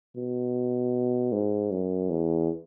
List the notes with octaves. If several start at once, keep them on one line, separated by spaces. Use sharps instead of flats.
B2
G#2
F#2
E2